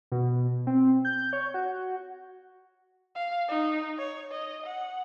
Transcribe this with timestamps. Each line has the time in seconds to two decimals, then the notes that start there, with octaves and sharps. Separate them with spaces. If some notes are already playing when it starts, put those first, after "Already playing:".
0.12 B2
0.67 C4
1.05 G6
1.33 C#5
1.54 F#4
3.15 F5
3.48 D#4
3.98 C#5
4.32 D#5
4.66 F#5